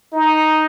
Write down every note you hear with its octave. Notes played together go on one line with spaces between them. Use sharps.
D#4